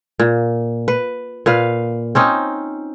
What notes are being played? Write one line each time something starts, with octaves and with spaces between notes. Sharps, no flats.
A#2
B4
A#2 B4 F5
C4 C#4 D#4